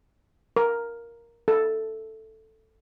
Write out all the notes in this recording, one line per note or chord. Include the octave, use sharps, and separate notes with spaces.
A#4
A4